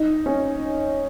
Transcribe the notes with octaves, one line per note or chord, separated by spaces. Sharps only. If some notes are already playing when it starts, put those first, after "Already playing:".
Already playing: D#4
C#4